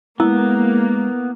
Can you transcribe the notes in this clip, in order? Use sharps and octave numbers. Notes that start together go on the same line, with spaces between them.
G#3 A#3 B3 E4